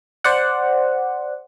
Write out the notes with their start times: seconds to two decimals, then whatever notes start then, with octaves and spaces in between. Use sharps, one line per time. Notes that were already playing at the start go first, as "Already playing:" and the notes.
0.24 C5 D5 F#5